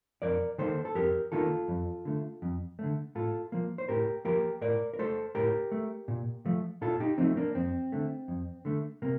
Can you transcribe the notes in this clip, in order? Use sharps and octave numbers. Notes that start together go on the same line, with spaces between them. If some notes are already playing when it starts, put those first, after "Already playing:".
F2 A#4 D5
D#3 A#3 A4 C5
A4
F2 G4 A#4
D#3 A#3 F4 A4
F2
D3 A3
F2
D3 A3
A2 F4 A4
F3 A#3
C5
A2 G4 A#4
F3 A#3 G4 A#4
A2 A#4 D5
A#4
A3 A4 C5
A2 G4 A#4
A3
A#2
F3 A3
A#2 F4 A4
D#4 G4
F3 A3 C4 D#4
A#3 D4
F2 C4
D3 A3
F2
D3 A3
C3 A#3